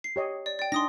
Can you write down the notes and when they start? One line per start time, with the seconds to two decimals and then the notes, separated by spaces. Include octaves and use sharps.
0.04 C7
0.16 G4 C#5 D#5
0.46 D5
0.59 D5 G5
0.72 D4 D#4 G#5 C6 D#6 A#6